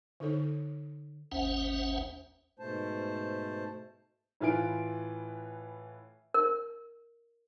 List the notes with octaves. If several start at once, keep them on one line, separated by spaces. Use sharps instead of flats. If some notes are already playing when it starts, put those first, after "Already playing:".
D3 D#4 A4 C#5
G#1 D#2 C#4 C5 E5 F#5
G#2 B2 A3 C5 A5
A2 E3 F4 B4 G#5 D7
A#4